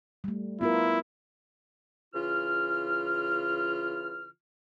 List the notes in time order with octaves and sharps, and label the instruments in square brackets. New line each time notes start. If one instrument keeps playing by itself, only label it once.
[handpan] G3 A3
[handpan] B3 F4 A#4 [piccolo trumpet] E4
[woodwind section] C#3 E3 F4 F6